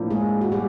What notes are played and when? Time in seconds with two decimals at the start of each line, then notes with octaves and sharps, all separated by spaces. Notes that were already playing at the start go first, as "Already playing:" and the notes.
Already playing: A2 F3 A#3 D4
0.10 G#3 G#4
0.41 F#4
0.52 G3 G4